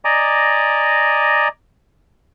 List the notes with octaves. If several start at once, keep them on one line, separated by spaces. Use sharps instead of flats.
D5 D#5 G#5 A#5 D6